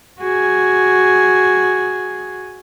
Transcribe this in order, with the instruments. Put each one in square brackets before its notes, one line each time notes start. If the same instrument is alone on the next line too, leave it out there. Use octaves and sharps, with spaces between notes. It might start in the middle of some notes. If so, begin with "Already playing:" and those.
[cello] F#4 G#4